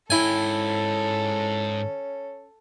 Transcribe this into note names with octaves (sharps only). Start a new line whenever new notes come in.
G#2 C#4 E4 A4 G5 G#5